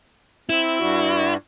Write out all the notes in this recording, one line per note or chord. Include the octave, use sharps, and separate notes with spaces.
C4 E4
G2 G3 F#4